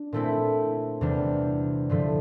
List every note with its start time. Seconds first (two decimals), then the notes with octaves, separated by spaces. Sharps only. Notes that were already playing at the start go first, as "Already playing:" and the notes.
Already playing: D4
0.13 A#2 A3 C4 E4
1.01 E2 C3 G3 D4
1.89 G2 D3 F3 A3